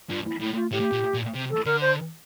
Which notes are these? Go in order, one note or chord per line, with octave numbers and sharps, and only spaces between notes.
G2 F4
E4
A2 E4
F4
A2 G4
A#2
A#2
C3
A4
D3 A#4
C5